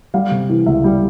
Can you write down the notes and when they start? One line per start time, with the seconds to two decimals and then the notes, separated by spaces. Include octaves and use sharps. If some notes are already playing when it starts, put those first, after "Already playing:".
0.14 G3 F5
0.31 C3
0.50 E3
0.66 C#2 E5
0.84 G3